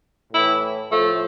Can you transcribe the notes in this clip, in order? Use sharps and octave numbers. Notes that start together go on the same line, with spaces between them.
A2 E3 E4
A2 F3 A3